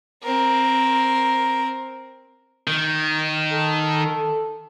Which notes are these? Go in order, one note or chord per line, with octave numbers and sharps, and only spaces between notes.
C4 A#4
D#3
A4